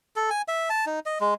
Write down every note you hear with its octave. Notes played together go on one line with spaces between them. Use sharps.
A4
G#5
E5
A5
D#4
D#5
G#3